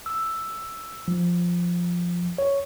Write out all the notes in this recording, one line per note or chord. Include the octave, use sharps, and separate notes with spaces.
E6
F3
C#5